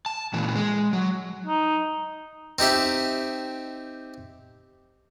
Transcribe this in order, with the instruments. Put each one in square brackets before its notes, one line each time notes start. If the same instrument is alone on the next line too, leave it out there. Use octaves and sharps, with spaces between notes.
[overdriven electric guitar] A5
A#2 E3
G#3
F#3
[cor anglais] D#4
[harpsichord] C4 D#4 G4 E5